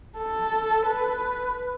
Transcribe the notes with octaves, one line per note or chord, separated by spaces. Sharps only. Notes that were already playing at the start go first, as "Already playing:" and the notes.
A4
B4